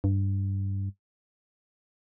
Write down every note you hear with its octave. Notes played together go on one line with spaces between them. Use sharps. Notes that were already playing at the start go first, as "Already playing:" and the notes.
G2